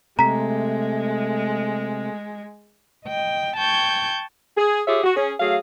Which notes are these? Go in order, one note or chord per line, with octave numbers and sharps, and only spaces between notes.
C3 G#3 A3 A#5 B6
D#5 G5
G5 A5 C#6 G6 G#6
G#4
F4 G4 G#4 C#5 E5
F#4
C#4 G#4
F#3 A3 G#4 F5